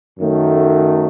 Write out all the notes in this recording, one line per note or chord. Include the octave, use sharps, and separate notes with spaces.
F#2 D#3 F#3 A3